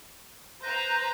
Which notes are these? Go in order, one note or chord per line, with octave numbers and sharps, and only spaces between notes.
B4 C5 A#5 G6 A#6